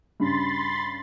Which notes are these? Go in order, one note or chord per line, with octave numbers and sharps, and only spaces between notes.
G2 C#3 B5 C6 A6